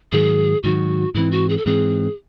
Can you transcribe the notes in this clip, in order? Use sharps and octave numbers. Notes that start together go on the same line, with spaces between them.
G#2 D#3 F#3 G#4
G#2 D#3 F#3 F#4
G#2 E3 C4 E4
F#4
G#4
A4
G#2 E3 C4 G#4